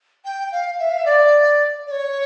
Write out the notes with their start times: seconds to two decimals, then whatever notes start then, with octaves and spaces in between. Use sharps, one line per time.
0.24 G5
0.52 F5
0.79 E5
0.89 F5
0.97 E5
1.05 D5
1.87 D5
1.91 C#5